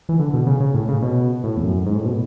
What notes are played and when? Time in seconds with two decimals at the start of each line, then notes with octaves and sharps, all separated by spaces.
0.09 E3
0.20 D3
0.34 B2
0.47 C#3
0.60 C#3
0.74 A2
0.89 C#3
1.02 B2
1.44 A2
1.57 E2
1.64 F#2
1.86 G#2
1.96 A2
2.06 B2